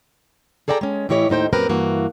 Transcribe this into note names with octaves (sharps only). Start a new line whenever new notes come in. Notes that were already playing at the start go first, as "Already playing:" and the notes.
G#4 A4 D5 G5 A5 A#5
G#3 C#4
A2 E3 E4 G4 C#5 D#5
D#2 A2 D#4 C5 G5
F#2 A#2 C4 G4 A#4 B4
G2 E3 A#3 F#4